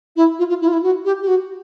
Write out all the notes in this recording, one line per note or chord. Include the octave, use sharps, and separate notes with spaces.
E4
F4
F4
E4
F4
E4
F#4
G4
G4
F#4